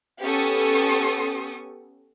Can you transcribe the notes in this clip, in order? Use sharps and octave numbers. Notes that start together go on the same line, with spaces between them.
B3 C#4 G4 A4 C#6 D#6